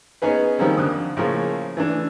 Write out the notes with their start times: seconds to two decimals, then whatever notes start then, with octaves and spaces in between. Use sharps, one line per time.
0.22 B3 C#4 D#4 G#4 B4
0.58 D#3 F3 G3 A#3 C4 C#4
0.77 F2 D3 D#6
1.17 A2 C#3 F3 A#3
1.77 E3 A3 D4